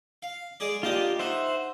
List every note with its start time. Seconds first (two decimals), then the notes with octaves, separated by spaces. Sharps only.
0.23 F5
0.60 G#3 G#4 D5
0.83 A#3 D4 F4 G4 D#5
1.19 D#4 C5 E5 F#5